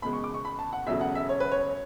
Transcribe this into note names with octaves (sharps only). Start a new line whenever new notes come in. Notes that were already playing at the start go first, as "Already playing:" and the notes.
F#1 E2 B2 G#3 B5
C#6
D6
C#6
B5
A5
F#5
E1 E2 C#3 F#3 A3 E5
F#5
E5
C#5
B4
C#5